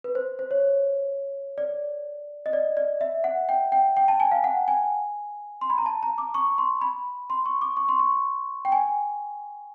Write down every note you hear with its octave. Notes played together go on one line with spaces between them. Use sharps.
B4
C5
C5
C#5
D5
D#5
D5
D5
E5
F#5
G5
G5
G5
A5
G#5
F5
F#5
G#5
C6
B5
A#5
A5
A#5
D6
C#6
C6
B5
C6
C#6
D6
C#6
C6
C#6
G5
G#5